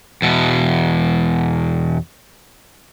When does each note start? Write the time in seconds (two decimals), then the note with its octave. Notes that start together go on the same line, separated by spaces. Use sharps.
0.22 E2 B2